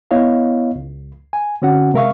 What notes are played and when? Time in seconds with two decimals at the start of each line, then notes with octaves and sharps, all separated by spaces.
0.11 B3 E4 C#5 D#5 F5
0.76 C#2
1.33 G#5
1.62 D3 C4 C#4 F#4 F#5
1.94 C3 G#3 A#4 E5 F5 C#6